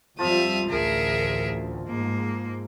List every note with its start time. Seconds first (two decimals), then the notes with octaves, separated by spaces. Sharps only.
0.19 F2 F3 G3 F4 E5 F5 D#6 E6
0.68 A1 D2 G#4 A#4 E5
1.88 G#2 A#3